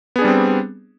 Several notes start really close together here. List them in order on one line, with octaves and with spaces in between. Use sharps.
B3 G#4 D4 G3 C4